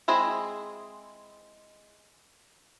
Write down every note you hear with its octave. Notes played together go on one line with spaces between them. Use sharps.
G#3 C4 E4 G#4 D#5